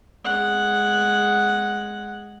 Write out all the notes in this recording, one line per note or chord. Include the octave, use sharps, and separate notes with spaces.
G#3 F#5